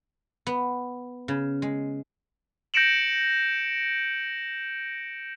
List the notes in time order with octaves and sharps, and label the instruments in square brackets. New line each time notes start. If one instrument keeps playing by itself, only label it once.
[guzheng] B3
C#3
G#3
[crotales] G6 A#6 C#7 D7 E7 F#7